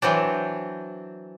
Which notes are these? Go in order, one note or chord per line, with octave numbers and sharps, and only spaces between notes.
E3 F#3 C4 D4